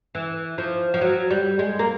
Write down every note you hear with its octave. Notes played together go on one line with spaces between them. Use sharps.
E3
F3
F3
F#3
G3
G#3
A#3